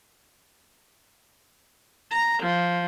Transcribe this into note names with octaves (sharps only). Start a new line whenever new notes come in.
A#5
F3